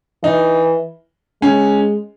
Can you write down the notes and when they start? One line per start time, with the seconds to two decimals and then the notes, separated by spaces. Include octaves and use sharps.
0.24 E3 D#4
1.42 G#3 C#4